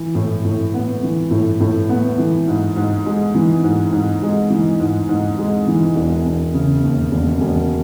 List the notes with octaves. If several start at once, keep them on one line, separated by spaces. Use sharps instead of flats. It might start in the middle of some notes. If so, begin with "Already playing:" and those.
Already playing: E3
A2
A2
B3
E3
A2
A2
B3
E3
G#2
G#2
G#3
E3
G#2
G#2
G#3
E3
G#2
G#2
G#3
E3
E1
E1
C#3
D#2
E1
E1